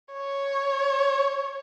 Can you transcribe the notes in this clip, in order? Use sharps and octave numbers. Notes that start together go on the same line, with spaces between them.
C#5